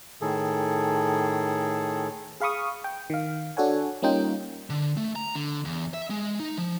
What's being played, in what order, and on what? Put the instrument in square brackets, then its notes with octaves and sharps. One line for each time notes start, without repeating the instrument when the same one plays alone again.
[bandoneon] A2 D#3 G#4 A4
[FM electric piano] G#4 F5 B5 C#6 D#6
G5
D#3 F5
D4 F#4 A4 C#5 F#5 G#5
G3 A#3 C#4 D#4 F4 G5
[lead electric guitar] D3
A3
A#5
D3
E2
E5
G#3
D#4
F3